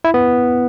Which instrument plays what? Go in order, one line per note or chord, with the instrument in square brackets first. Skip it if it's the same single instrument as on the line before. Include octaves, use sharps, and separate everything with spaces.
[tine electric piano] E4
B3